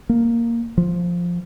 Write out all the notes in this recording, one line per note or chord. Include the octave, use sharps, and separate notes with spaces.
A#3
F3